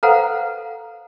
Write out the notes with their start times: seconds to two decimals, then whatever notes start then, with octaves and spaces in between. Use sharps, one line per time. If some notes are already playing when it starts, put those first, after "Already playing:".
0.03 A4 B4 C5 F5 F#5 A#5